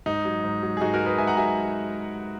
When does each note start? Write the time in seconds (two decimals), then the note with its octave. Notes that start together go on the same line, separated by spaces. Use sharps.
0.06 G#2 D#4
0.25 F#3
0.44 G#2
0.63 F#3
0.77 G#4
0.81 G#2 D#4 F#4
0.94 F#4 A#4
1.00 F#3
1.06 G#4 B4
1.18 G#2 E5 G#5
1.27 F#5 A#5
1.37 F#3 E5 G#5